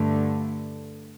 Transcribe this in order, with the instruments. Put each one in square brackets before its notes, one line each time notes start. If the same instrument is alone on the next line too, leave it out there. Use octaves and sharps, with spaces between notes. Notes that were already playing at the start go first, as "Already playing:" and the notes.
Already playing: [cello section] G2 D3 A3